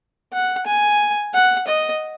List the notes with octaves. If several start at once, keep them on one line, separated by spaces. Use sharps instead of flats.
F#5
G#5
F#5
D#5